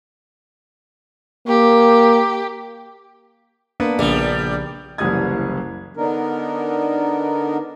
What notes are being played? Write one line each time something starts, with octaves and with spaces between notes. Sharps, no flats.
A#3 G4
A#3 B3 D4
A#1 C#3 G3 D5
F#1 C2 E3 G3 D#6 G#6
D3 B3 D4 D#4 A#4